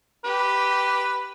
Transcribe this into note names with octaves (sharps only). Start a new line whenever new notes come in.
G4 B4